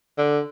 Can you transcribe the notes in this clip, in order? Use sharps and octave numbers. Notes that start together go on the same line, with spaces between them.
D3